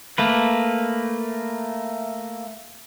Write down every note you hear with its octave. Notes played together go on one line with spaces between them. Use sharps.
A3 A#3 B4